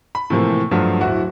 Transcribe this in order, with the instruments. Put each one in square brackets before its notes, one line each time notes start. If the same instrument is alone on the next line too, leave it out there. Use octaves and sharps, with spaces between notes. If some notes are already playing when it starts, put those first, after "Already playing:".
[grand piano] B5
A2 C3 E3 F3 A3 A#3
G2 F3 F#3 A3 F4
D1 E4 F#4 F#5